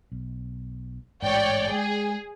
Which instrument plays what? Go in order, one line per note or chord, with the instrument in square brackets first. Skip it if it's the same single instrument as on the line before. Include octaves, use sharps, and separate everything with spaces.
[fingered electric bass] B1
[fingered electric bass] A1 G#2 [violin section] C#5 D5 G5
[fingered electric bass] G#3 [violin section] G#4